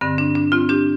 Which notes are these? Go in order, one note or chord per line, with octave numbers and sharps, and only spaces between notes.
G2 D3 C4
D4
D4
C4 F4
D4 G4